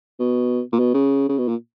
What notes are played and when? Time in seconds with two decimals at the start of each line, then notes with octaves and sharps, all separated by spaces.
0.20 B2
0.73 A#2
0.79 B2
0.94 C#3
1.29 C#3
1.38 B2
1.48 A#2